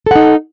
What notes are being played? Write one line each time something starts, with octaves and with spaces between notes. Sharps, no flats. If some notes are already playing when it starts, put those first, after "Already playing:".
D#4 A4 F#5